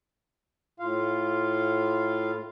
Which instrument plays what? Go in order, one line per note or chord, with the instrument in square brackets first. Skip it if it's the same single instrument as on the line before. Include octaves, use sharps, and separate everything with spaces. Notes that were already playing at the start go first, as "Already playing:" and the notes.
[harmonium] A2 F4 F5